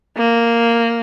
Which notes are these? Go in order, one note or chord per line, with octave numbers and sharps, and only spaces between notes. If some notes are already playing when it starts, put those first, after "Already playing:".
A#3